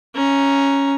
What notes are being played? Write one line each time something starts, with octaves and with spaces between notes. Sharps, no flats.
C#4 A#5